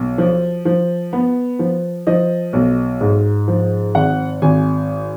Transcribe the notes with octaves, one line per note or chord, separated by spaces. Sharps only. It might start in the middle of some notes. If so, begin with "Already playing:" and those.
Already playing: B1
F3
F3
B3
F3
F3 D#5
B1
G#2
F3
G#1 F#5
G#1 G#5